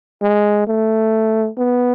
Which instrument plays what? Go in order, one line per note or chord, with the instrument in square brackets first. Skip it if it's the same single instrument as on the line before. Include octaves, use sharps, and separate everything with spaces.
[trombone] G#3
A3
B3